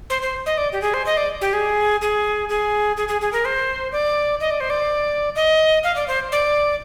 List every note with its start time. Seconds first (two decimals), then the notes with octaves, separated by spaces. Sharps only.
0.10 C5
0.22 C5
0.46 D#5
0.57 D5
0.72 G4
0.81 G#4
0.94 C5
1.06 D#5
1.17 D5
1.41 G4
1.53 G#4
2.01 G#4
2.49 G#4
2.97 G#4
3.08 G#4
3.21 G#4
3.32 A#4
3.45 C5
3.92 D5
4.40 D#5
4.50 D5
4.60 C5
4.70 D5
5.35 D#5
5.84 F5
5.96 D5
6.08 C5
6.32 D5